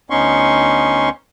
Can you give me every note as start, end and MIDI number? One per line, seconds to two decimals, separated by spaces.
0.10 1.09 38
0.10 1.09 59
0.10 1.09 61
0.10 1.09 63
0.10 1.09 84
0.10 1.09 85